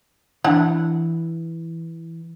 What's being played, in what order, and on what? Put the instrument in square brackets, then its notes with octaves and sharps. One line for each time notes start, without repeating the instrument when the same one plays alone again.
[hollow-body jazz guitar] E3 [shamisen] D4 F#5